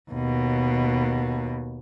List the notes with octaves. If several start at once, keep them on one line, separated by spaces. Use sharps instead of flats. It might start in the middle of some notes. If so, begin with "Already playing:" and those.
D#2 B2